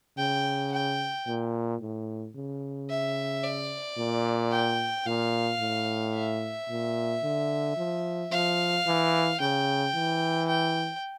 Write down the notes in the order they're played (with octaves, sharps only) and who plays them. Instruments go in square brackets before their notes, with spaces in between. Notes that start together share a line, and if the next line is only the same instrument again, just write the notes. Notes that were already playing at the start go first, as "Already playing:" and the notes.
[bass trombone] C#3 [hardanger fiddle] G5
[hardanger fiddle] G5
[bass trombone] A#2
A2
C#3
[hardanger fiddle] E5
D5
[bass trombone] A#2
[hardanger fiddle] G5
[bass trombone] A#2 [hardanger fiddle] F5
[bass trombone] A2
[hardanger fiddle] E5
[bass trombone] A#2
D3
F3
[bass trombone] F3 [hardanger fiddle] F5
[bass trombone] E3
[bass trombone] C#3 [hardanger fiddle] G5
[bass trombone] E3
[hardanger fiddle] G5